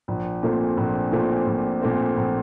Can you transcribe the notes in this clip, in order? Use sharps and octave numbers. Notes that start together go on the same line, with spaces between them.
A#1
A#2 A3 C4
A#1
A#2 A3 C4
A#1
A#2 A3 C4
A#1